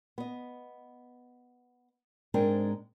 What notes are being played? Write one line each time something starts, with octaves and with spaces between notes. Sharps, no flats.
B3 D#5
G#2 G#3 C4 D4 A#4 G5